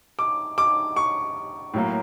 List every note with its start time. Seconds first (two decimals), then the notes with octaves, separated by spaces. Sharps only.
0.19 D6
0.58 D6
0.96 C#6
1.74 A2 F#3 A#3